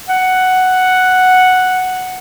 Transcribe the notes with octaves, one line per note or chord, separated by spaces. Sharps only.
F#5